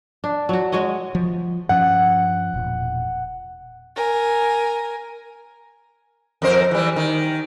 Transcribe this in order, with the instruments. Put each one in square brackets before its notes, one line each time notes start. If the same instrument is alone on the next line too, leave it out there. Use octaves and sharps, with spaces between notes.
[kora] D4
F#3 F#4
G#3 F#4 C#5 D#5
[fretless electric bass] F3
[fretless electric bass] G2 F3 C#4 [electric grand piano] F#5
[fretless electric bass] E1 A#2
[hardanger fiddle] A#4 G#5
[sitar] F2 A#4 C5
E3 G3
D#3